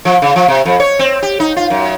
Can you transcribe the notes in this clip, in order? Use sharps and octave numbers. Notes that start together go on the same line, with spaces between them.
F3
C#3
F3
C3
F2
C#5
C4
G4
D#4
F4
F#2